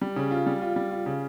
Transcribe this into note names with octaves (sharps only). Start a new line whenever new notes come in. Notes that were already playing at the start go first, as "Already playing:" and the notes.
G3
C#3
F4
G3
F4
G3
F4
C#3